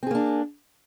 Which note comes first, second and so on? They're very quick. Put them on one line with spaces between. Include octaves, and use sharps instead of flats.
C4 G#4 A#3 D4